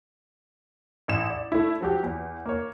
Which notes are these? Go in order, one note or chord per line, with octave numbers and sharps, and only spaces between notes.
A1 E7
D5
A3 E4
F3 F#3 G4
E2
A#3 C#5